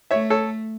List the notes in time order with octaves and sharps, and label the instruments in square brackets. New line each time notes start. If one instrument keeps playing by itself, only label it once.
[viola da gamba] A3 [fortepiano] C#5 E5
[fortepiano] A4 C#5